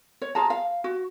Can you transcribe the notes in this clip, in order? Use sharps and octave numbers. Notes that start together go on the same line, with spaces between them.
C#5
F4 G#4 A5 A#5
F5
F#4